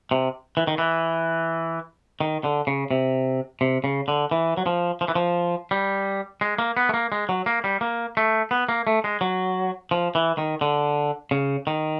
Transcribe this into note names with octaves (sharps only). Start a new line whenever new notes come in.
C3
E3
D#3
E3
D#3
D3
C#3
C3
C3
C#3
D3
E3
F#3
F3
F3
E3
F3
G3
G#3
A#3
B3
A3
A#3
G#3
F#3
A#3
G3
A#3
A3
B3
A#3
A3
G#3
F#3
F3
E3
D#3
D3
C#3
D#3